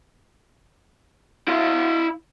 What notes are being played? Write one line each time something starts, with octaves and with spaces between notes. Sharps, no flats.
E4 F5